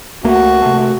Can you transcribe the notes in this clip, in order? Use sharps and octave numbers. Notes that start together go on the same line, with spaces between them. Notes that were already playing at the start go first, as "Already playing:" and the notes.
C#2 A3 A#3 F#4
C3 A3